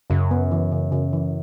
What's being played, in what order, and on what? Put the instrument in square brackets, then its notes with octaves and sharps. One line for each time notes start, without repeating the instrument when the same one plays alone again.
[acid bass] F#2 [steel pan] C#3
[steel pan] B3
E3
C#3
C#3
E3